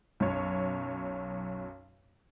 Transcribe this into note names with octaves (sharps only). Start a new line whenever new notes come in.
B1 F#2 C#5